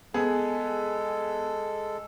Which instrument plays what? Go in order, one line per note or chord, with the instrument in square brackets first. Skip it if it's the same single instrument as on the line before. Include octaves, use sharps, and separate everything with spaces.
[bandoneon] G#3 A4 [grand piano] B3 G#4